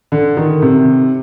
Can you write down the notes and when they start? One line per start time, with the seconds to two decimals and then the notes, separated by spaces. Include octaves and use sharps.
0.12 D3
0.37 D#3
0.62 C3